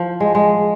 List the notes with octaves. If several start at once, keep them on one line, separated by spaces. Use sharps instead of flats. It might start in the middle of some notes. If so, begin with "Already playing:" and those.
Already playing: F3
G#3
G#3